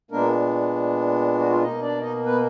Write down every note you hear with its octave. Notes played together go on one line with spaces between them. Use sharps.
A#2 G#3 A#3 B3 D4 A#4
F#4
F4
B2 A#3 D#4 D#5
D4 D5
D#4 D#5
B3 B4